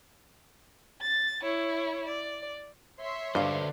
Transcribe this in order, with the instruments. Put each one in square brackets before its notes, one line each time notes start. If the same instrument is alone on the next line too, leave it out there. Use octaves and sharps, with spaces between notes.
[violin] A6
E4 C#5
D5
[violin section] C#5 E5 C6
[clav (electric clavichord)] G2 [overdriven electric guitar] D3 C5 [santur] D5 F5